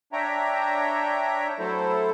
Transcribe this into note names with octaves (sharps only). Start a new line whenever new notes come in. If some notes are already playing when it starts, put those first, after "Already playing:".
D4 C#5 E5 G5 A#5
F#3 A3 E4 A4 C5